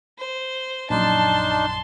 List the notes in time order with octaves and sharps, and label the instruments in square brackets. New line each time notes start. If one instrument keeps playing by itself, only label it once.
[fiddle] C5
[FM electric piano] A#1 F#2 [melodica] D4 D#4 [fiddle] A5 C6